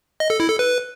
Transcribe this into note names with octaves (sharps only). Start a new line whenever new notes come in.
D#5
A4
E4
A4
B4